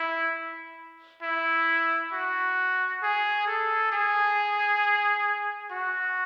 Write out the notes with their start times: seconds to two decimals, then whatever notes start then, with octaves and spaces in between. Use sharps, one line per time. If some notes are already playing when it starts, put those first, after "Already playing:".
Already playing: E4
1.22 E4
2.13 F#4
3.03 G#4
3.47 A4
3.92 G#4
5.71 F#4